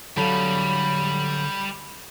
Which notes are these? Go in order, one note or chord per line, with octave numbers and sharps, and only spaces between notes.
D3 F#3 G3 A4 F5 B5